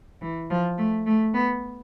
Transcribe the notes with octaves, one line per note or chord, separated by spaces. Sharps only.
E3
F3
A3
A3
B3